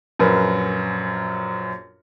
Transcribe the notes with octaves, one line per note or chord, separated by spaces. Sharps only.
A#1 F#2 A#4 B4